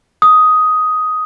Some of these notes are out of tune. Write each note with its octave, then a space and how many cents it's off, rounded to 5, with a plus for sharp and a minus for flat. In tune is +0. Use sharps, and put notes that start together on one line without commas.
D#6 +10